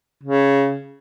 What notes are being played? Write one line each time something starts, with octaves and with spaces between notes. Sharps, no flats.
C#3